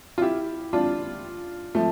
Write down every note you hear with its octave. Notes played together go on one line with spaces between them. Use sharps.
F4
E4 G4
D4 F4
F3 A3